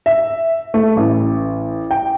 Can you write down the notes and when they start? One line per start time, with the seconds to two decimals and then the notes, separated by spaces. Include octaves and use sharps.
0.06 E5
0.74 A3
0.97 A1
1.91 G5